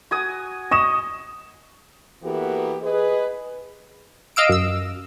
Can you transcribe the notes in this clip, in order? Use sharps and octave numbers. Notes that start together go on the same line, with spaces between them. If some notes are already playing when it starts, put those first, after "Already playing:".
F#4 G#5 D#6
D#5 C#6 D#6 E7
E3 A#3 B3 F#4 G4 A4
G#4 B4 D#5
D#5 F5 E6 D7
F#2 E6